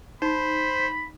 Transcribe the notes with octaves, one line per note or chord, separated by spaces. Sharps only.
D#4 C5 B5